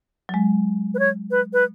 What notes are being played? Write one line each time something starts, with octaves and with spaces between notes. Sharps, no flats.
F#3
G#3
B4
C#5
B4
B4